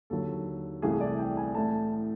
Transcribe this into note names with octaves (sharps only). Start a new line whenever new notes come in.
D#2 D3 F#3 A4
C2 C3 E3 A3 G#4
D5
G5
G#5
A2 E3 A3 A5